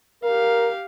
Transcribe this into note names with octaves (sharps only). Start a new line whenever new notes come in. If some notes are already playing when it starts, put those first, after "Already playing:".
G4 A#4 F5